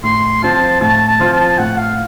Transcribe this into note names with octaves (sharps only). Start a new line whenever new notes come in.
A2 C6
F3 C4 F4 A5
A2 A5
A5
F3 C4 F4
A5
A2 F#5
F5